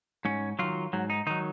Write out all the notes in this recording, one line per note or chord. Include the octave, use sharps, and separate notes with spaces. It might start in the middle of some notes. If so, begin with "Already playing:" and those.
G#2 C#4
D#3 F#3 F4
G#2 F#3
D#4
D#3 F#3 D#4